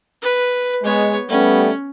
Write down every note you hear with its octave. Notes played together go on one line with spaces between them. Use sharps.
B4
G#3 B3 C#5
G3 A3 B3 C#4